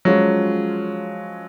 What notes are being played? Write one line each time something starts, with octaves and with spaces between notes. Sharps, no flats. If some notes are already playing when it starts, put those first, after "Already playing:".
F3 F#3 G#3 C#4 F4